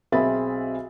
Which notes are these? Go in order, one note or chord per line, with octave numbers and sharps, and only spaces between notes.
B1 C4 G#4 E5 B5 A6